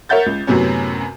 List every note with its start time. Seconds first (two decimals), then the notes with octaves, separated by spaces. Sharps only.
0.09 A#4 C#5 E5 F#5 G6 A6
0.26 C#2
0.47 F#2 A2 C3 F#3 B3 C#4